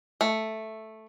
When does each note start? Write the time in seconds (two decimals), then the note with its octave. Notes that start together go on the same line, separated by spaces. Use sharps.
0.21 A3